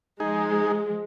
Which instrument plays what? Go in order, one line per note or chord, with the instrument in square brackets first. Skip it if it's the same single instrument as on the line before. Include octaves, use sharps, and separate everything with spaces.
[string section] F3 G#3 [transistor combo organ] D#4 G#4